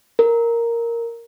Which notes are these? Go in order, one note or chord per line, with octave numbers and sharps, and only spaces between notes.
A#4